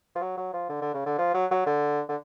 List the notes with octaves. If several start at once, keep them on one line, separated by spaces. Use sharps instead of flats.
F3
F#3
F#3
F3
D3
D3
C#3
D3
F3
F#3
F#3
D3
D3